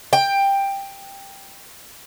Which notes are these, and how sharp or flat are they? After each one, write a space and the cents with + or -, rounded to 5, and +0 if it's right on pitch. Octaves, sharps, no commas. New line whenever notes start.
G5 +10